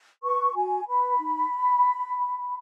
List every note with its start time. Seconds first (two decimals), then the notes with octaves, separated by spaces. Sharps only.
0.23 B4 C#6
0.55 F#4 G#5
0.87 B4 B5
1.19 D#4